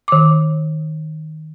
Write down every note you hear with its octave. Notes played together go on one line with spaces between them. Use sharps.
D#3 D6